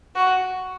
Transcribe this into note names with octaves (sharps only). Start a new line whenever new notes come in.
F#4